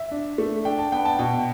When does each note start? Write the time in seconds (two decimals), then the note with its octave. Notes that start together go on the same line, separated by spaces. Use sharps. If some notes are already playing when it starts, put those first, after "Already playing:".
Already playing: E5
0.11 D4
0.38 A3
0.65 D4 G5
0.79 A5
0.92 B3 G5
1.05 A5
1.19 B2 G5